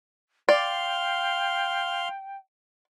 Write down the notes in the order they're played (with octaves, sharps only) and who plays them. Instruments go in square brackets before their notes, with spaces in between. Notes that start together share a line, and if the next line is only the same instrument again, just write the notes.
[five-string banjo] D5 [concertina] F5 C6 F6 [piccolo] G5